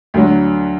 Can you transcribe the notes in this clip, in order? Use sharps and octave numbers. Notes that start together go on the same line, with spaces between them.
D2 D3 F#3